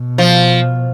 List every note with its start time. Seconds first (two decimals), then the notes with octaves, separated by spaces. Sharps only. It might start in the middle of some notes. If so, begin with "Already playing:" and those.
Already playing: B2
0.18 F3